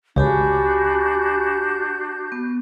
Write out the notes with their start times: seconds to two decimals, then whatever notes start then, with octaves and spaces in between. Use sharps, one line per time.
0.16 C#2 D4 F#4 G4 G#5 B5 G6
2.32 B3